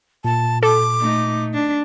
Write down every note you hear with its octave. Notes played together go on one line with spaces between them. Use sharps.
A#2 A5
A4 D6
A3 D#4
D4